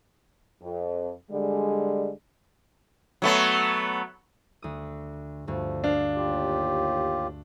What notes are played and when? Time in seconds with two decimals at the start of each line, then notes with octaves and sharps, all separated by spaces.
0.62 F2
1.30 D3 G3 G#3
3.22 F#3 A3 B3
4.62 D2 D#6
5.47 D2 G2 F3
5.84 D4 F5
6.15 D#2 F4 G4